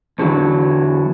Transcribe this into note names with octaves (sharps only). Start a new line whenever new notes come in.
E2 D3 E3 F#3